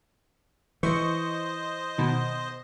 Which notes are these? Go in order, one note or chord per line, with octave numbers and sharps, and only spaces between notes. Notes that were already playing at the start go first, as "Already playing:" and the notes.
E3 C5 D#5 C#6
B2 D#3